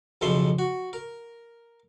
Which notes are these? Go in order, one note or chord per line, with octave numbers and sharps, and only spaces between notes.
B1 F2 C#3 F3 E5 C6
F#4
A#4